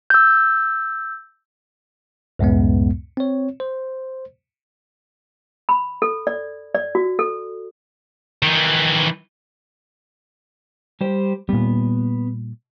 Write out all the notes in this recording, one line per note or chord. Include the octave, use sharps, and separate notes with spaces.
E6 G6
C#2 F#2 A2 G#3 B3
C4 C#5
C5
B5
A4
D5
D5
F#4
A4
D#3 E3
G3 G4 C5
A#2 G3 B3